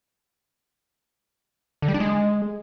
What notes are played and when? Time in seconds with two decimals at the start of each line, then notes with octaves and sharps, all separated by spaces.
1.82 D3
1.88 G3
1.94 D4
2.00 G#3